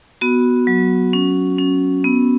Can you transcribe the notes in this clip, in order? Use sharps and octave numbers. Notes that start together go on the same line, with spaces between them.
B3 F#4
F#3
C#4
C#4
B3